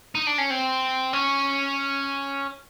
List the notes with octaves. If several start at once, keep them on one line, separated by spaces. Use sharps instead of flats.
D#4
D4
C#4
C4
C#4